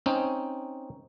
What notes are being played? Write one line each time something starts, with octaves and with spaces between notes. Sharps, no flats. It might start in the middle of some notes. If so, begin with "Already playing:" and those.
C4 C#4 D#4